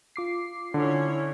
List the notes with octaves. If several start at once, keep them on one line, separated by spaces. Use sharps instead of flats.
F4 D6 C7
D3 C#4 E4 C#5